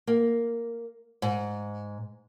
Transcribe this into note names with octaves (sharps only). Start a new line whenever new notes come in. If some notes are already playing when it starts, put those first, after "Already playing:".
A#3
G#2